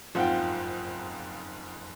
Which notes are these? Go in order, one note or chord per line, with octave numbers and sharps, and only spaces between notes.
F#1 F2 G#2 F4 F#5 G5